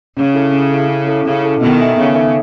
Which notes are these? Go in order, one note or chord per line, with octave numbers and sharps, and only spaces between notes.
C#3 C#4
E4 A4
C#4
E4 A4
C#4
E4 A4
C#3 C#4
E4 A4
B2 D#3 B3
D#4 A4 E5 G#5
C#3 B3
D#4 A4 E5 G#5